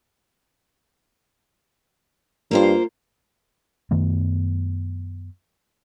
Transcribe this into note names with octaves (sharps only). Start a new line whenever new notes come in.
G2 A#3 F4 C5
F#2 D#3 A3 B3